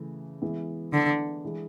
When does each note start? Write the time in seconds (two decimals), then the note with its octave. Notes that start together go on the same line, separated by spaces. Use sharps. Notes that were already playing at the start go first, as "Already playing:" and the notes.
Already playing: C#3 E3 A3
0.42 E3 G#3 B3 E4
0.93 D3
1.45 E3 G#3